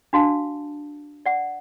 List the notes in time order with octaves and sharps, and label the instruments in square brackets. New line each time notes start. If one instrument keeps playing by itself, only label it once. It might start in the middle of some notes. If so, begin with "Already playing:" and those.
[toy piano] D4 F#4 F5 A5
D5 F#5